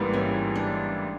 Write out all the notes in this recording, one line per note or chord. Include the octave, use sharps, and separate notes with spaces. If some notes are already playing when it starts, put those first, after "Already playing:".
Already playing: A1 G#2 E3 G3 A#3 B3
C#4
D4